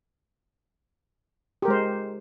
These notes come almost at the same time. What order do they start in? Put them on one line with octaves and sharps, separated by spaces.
G4 A#4 G#3 C5